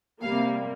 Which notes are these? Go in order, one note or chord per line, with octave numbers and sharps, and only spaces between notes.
C3 G3 A#3 F5